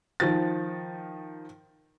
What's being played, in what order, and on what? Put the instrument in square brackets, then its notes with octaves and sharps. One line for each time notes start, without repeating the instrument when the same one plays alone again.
[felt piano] D#3 F3 A6